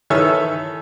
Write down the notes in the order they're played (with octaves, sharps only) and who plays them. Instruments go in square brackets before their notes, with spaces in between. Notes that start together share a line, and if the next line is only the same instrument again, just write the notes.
[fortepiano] D#3 E3 A4 C#5 E5 F6